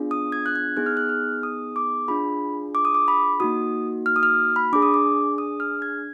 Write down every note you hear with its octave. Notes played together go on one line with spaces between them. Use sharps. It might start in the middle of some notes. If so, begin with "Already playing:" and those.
Already playing: B3 D4 F4 G#4
D#6
G#6
F#6
G#6
B3 D#4 G#4 F#6
F6
F#6
F6
D#6
D6
D4 F4 G#4 B5
D6
D#6
D6
B5
A#3 D#4 F#4 D#6
F6
D#6
F6
B5
D4 G#4 D6
D#6
D6
D#6
F6
G#6